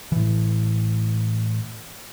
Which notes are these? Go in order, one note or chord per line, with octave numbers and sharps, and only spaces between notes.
A2 E3